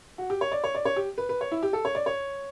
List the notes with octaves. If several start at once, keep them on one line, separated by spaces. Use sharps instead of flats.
F#4
G4
C#5
D5
C#5
D5
C#5
G4
B4
B4
C#5
E4
G4
A4
C#5
D5
C#5